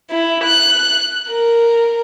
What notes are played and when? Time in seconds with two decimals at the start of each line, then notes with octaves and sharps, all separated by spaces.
0.10 E4
0.44 F#6
1.29 A#4